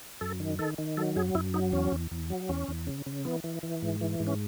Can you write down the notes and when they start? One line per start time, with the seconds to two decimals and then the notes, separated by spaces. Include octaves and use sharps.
0.21 F#2 A4
0.40 D#3
0.59 D#3 A4
0.78 D#3
0.97 F#3 A4
1.16 F#2 G#4
1.35 F#2 E4
1.54 F#3 D#4
1.73 E2 C#4
1.92 E2
2.11 E2
2.30 F#3
2.49 E2 C#4
2.68 E2
2.87 C#3
3.06 C#3
3.25 E3 B3
3.44 E3
3.63 E3
3.82 G#2
4.01 E3
4.20 G#2
4.27 C#4